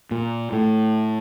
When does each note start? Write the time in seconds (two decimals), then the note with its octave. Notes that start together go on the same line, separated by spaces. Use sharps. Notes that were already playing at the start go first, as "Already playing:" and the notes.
0.11 A#2
0.52 A2